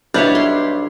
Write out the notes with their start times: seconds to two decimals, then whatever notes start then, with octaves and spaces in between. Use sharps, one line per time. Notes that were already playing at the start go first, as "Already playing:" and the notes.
0.14 B1 G3 D4 E4 C#5
0.35 C6